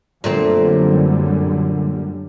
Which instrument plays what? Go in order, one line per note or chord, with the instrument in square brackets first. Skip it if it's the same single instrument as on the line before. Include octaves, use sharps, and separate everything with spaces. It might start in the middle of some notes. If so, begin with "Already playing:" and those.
[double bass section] F#2 D3 G3 [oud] A#2 A3 C4